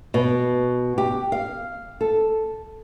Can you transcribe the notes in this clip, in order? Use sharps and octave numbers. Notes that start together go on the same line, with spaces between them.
B2
G4
F5
A4